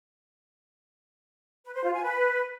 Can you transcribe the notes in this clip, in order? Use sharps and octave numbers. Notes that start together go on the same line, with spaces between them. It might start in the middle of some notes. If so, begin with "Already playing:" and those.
B4
C5
F4
G#5
B4